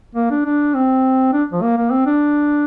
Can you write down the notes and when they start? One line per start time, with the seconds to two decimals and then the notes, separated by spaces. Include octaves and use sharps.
0.15 A#3
0.30 D4
0.45 D4
0.74 C4
1.33 D4
1.52 F3
1.62 A#3
1.77 A#3
1.91 C4
2.06 D4